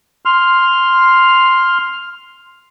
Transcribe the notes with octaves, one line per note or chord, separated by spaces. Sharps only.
C6 F6